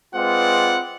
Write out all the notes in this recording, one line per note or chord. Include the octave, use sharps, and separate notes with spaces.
G#3 C4 F4 B4 D5 F#5